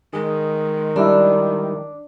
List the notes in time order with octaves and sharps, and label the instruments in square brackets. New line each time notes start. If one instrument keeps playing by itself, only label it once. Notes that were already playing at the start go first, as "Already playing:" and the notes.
[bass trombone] D#3 [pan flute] G#3 [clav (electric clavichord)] G#4
[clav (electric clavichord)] G3 E4 [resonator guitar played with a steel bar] D4